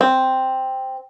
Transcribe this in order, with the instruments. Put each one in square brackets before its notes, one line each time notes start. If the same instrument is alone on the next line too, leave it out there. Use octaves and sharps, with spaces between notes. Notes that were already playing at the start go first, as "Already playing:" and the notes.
[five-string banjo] C4